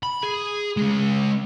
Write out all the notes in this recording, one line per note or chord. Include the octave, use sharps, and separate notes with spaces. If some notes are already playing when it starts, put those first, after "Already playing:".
B5
G#4
G#3 C#4